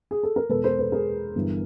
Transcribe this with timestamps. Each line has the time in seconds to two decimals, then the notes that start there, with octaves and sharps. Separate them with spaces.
0.11 G#4
0.23 A4
0.36 A#4
0.49 E2 B2 G#3 A4 B4
0.64 A#4 C5
0.79 A4 B4
0.92 G#4 A#4
1.36 G1 G2 E3